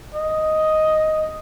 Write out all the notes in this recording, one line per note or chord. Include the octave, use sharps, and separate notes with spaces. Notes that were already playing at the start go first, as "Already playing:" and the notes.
D#5